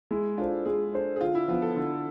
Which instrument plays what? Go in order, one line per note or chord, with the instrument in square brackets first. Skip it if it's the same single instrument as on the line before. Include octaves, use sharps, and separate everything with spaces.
[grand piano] G#3 [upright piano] E4
[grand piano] D4 A4 C5 [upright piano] F4
[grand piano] G#3 [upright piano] G#4
[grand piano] D4 A4 C5
[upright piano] G#4
[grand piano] D3 [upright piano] F4
[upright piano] E4
[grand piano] F3 B3 [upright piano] F4
[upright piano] A4
[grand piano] D3